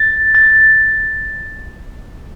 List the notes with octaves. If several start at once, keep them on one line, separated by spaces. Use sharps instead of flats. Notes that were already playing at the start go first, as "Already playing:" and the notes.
Already playing: A6
A6